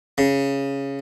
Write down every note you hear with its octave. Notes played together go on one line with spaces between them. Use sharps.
C#3